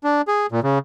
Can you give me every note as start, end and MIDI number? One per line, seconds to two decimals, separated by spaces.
0.04 0.22 62
0.28 0.46 68
0.52 0.60 46
0.63 0.79 49